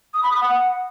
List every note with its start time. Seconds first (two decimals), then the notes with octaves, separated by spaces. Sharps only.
0.14 D#6
0.23 B5
0.32 D#6
0.41 F#5